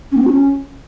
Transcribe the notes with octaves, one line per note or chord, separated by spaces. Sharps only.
C#4
A#3
C4
F#4
C#4